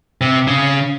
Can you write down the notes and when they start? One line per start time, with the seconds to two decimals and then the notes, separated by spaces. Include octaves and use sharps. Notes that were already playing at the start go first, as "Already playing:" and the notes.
0.21 C3
0.47 C#3